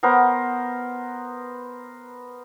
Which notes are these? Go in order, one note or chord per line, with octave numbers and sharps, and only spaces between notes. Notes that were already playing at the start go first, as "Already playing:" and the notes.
B3 A#4 C5